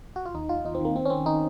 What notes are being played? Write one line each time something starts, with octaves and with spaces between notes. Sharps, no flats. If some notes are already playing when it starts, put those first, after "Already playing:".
F#4
F4
D#2 D#4
D#2 F4
D#2 D#4
C4
D#3 A#3
D#3 C4
C#4
D#3 C4
D#3 D#4